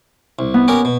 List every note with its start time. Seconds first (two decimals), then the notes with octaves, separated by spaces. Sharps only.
0.39 C2
0.54 B3
0.68 C#4 G4 A#4
0.85 B2